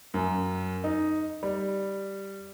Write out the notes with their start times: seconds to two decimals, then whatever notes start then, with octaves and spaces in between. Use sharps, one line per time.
0.14 F#2
0.84 D#4
1.43 G3